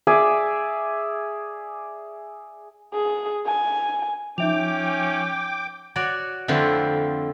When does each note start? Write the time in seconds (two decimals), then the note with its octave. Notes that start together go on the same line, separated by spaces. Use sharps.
0.07 G#4 D5 E5 G#5
2.94 G#4
3.46 G#5
4.38 F3 C#4 D#4 E5 G5 D6 F7
5.96 F#4 C#5 D5
6.48 F2 D3 A3 C4 E4 F4